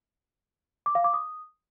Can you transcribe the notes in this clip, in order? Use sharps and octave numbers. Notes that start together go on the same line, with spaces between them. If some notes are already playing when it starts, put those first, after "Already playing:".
D6
F5
D6
D#6